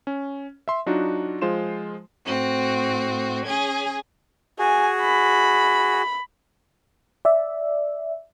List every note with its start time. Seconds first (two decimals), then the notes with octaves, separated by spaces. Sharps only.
0.07 C#4
0.68 E5 C6
0.86 F#3 D4 D#4 F4 F#4
1.42 F3 G#3 F4 C5 C6 E7
2.25 A2 C4 F#4
3.46 C#4 G#4 G#5
4.59 F#4 G#4 G#5
5.01 B5
7.25 D5 E5